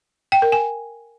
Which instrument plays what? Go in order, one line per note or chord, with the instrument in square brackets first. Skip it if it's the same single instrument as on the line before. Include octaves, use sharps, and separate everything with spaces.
[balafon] G5
A#4
G#5